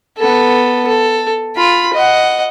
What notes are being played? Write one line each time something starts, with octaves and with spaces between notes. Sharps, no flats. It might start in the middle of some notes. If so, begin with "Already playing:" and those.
B3 A4
A4
F4 B5
D#5 F#5